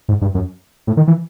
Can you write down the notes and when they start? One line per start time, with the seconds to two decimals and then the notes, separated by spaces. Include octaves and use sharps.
0.09 G#2
0.21 G2
0.34 F#2
0.87 A2
0.97 D#3
1.08 E3